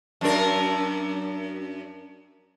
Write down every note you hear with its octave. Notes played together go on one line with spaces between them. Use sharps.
F#2 D4 A#4